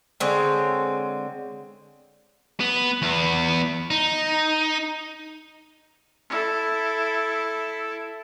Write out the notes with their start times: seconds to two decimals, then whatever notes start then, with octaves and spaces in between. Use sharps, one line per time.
0.20 D3 G#3 C4 C#5
2.60 B3
3.02 E2 B3
3.91 D#4
6.29 E4 A4